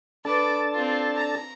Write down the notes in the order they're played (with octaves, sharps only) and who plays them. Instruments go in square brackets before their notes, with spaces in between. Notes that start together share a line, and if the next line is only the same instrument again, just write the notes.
[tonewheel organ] D4 A4 A5 [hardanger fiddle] B4 D6
[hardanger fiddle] C4 F4
A#5